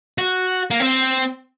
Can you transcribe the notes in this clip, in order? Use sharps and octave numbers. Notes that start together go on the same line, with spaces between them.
F#4
A#3
C4